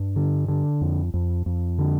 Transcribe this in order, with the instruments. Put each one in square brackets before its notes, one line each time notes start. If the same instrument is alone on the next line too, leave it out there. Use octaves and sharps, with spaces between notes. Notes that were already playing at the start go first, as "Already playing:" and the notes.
Already playing: [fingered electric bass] G2
D3
D3
F2
F2
F2
D3